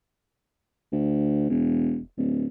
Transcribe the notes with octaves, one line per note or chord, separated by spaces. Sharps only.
D2
E1
D1